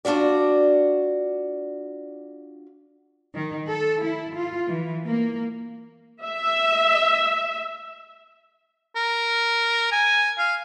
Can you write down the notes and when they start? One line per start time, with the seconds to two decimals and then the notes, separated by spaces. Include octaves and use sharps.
0.05 D4 F4 F#4 D5
3.35 D#3
3.70 A4
4.04 E4
4.36 F4
4.70 E3
5.06 A#3
6.26 E5
8.96 A#4
9.92 G#5
10.38 F5